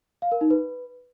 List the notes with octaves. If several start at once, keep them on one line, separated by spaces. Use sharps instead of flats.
F5
A#4
D#4
B4